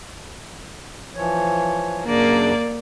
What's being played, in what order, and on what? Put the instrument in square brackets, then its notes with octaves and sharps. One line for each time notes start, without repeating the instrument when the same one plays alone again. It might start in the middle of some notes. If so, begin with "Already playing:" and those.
[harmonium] E3 F3 C#5
[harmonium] F#2 C#3 D4 [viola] A#3 D5